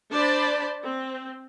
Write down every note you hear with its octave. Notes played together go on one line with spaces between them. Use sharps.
D4 C5 D5 A5 B5
C4